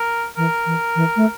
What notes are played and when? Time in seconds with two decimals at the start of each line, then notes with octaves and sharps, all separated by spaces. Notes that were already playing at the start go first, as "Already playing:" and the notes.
Already playing: A#4
0.37 E3 A#4
0.66 E3
0.96 E3
1.16 A3